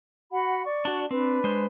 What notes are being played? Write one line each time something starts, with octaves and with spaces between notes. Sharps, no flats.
F#4 F#5 B5
D5 C#6
D4 F#4
C4 D4 B4
G#3 C5